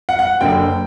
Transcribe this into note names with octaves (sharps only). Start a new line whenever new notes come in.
F#5
F#5
F#1 F#2 D3 G5